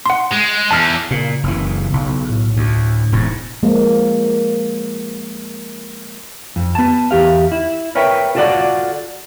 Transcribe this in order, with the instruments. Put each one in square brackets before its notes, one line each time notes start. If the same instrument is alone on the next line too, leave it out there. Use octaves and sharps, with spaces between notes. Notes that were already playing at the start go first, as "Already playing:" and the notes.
[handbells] F#5 C6
[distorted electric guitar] G#3
[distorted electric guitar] E2 [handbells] A5 F6
[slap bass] A#2 [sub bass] C#3
[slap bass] F#1 E3
B1
[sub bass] A2
[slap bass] D2
E1 G#2
[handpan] F3 G#3 A#3
[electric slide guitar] F2
B3 A5
E2 G4 F5
E4
A#4 B4 C#5 E5 G5
F4 F#4 A4 A#4 D5 F#5